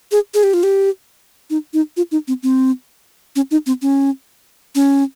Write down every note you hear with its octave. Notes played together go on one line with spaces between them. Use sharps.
G#4
G#4
G4
F4
G4
D#4
D#4
F4
D#4
C4
C4
C#4
D#4
C4
C#4
C#4